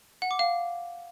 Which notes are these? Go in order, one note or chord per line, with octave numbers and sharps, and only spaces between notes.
F#5
D6
F5